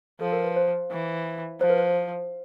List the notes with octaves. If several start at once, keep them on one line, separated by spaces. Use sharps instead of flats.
F3 A4
A#4
B4
C5
E3
F3 C5
B4
C5